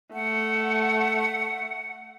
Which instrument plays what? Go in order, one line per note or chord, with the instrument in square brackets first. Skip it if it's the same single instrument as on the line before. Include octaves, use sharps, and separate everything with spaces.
[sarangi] A3 [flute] F#5